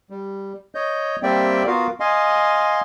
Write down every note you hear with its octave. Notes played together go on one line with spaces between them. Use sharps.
G3
C#5 D#5 G6
G3 A#3 C4 D5 E5 G5
B3 F4 F#4 A#4 F5
D#5 F5 G#5 C6